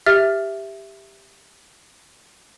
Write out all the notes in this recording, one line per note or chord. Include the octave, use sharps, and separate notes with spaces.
G4 E5 F6 A6